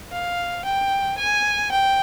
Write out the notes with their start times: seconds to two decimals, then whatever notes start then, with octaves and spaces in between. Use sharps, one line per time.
0.12 F5
0.65 G5
1.18 G#5
1.71 G5